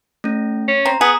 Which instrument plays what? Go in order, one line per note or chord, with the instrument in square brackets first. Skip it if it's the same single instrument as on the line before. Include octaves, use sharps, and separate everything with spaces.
[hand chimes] A3 C#4
[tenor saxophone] C#4
[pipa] C4 [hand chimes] A#5
[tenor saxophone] B3 [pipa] G#4